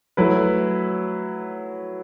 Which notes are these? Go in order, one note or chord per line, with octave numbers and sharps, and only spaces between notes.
F#3 A3 E4 B4